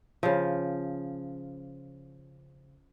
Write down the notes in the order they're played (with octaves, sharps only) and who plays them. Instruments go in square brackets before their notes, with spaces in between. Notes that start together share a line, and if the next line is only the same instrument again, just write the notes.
[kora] C#3 F3